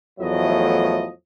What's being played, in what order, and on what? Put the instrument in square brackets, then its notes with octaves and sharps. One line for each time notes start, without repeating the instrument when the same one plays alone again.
[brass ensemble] E2 A2 F3 F#3 A3 D#5